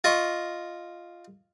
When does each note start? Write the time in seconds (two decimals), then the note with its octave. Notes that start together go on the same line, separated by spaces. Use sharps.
0.04 F4 D#5 C#6